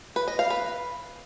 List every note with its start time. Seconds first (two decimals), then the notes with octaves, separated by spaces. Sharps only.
0.16 B4
0.28 D#5
0.39 F5
0.50 B4